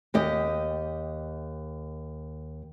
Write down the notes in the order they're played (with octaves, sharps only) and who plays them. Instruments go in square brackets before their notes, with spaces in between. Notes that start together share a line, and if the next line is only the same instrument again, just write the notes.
[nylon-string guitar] D#2 G4 D#5